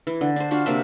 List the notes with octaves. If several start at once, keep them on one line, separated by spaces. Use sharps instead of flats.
E3
D3
D4 C5
D4 F4 F#4
C3 A#3 D4 E5